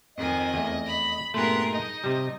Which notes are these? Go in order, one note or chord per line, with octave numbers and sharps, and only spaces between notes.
F2 D#3 D#5 G#5
E2 A3
B5
G2 A#2 A3 B3 G#4 A#4 C6
D#4 D#5
C3 G3